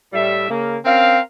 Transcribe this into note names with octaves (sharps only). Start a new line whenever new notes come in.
A2 G3 E5
C#3 A#3
C4 C#4 A#4 F5